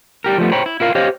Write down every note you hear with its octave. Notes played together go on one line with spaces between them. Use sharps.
G3 G4 A#4
F3 G3 A3 B3
C5 C#5 G5 A#5 B5
E4
E4 F4 A#4 F5
G4 C5 C#5 D#5 F5